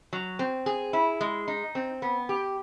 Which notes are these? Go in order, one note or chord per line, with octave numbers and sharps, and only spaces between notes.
F#3
C4
G#4
E4
G#3
D#4
C4
B3
G4